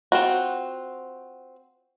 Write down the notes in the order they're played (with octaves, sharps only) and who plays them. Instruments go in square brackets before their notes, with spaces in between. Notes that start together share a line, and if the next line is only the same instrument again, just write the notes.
[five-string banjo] C4 F4 F#4